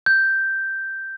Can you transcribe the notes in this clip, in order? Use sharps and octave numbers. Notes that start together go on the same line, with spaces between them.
G6